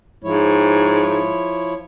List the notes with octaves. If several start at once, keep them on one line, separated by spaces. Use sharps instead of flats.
G#2 F3 E4 C#5